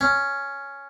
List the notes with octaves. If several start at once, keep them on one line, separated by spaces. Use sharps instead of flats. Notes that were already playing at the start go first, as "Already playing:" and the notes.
C#4